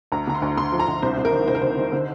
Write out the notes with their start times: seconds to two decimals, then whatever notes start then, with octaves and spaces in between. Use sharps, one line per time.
0.12 D2 A#5
0.27 D3 A#5
0.35 C6
0.42 D2
0.57 D3 C6
0.72 F3
0.79 A#5
0.87 D2
1.02 C2 C5
1.17 C2
1.25 A#4
1.32 D#3
1.48 C2 C5
1.55 A#4
1.62 D#3 C5
1.78 D#3
1.92 D3